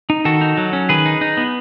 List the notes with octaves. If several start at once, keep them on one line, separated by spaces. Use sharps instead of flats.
D#4
D#3 F#4 A4
D#4
F#3
C#4
D#3 G#4 B4
D#4
D#4
B3